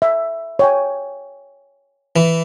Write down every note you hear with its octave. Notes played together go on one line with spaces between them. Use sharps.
E5
C#5 G5 G#5
E3